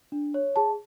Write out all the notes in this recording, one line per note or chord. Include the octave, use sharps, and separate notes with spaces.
D4
C#5
G#4 A5